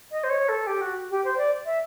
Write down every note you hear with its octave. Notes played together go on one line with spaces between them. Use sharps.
D#5
C5
C#5
A4
G4
F#4
G4
C5
D5
E5